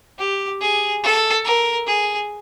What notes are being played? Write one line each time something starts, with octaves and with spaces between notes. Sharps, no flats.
G4
G#4
A4
A#4
G#4